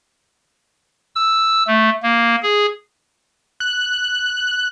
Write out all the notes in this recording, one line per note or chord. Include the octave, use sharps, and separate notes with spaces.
E6
A3
A#3
G#4
F#6